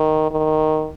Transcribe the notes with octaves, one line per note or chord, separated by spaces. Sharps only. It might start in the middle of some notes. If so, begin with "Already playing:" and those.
Already playing: D#3
D#3